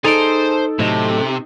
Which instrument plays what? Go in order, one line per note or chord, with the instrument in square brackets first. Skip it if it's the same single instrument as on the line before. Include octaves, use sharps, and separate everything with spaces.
[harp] D#4 D7 [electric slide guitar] G#4 D5 A#5 [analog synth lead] A4 [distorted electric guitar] C5
[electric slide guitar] A2 F#3 D#5 [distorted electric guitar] C3